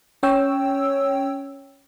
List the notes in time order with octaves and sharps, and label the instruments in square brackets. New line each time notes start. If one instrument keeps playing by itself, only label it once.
[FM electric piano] C#4 C#5 G5 E6